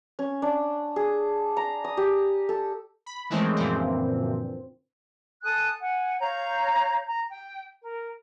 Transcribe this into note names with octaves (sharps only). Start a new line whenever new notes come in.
C#4
D4
G#4
A#5
D#6
G4
A4
B5
D#3 E3 G#3 A3 C4 C#4
F#2 A#2 D3 E3 F3 C4
A4 G#5 D#6 F#6
F#5 G#5
C#5 F5 A#5 G6
A#5
G5
A#4